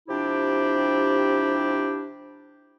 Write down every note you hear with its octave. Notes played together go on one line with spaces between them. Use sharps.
C3 F3 D4 E4 G4